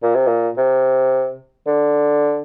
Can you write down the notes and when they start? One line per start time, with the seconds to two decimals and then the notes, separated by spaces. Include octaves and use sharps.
0.03 A#2
0.15 C3
0.27 A#2
0.57 C3
1.67 D3